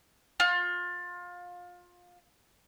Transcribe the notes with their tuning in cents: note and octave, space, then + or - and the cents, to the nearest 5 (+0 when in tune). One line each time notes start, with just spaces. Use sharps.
F4 +25